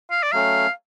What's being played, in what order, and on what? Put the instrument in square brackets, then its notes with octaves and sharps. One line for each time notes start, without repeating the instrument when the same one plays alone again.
[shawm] F5
D5
[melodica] F#3 A3 C#4 [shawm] F5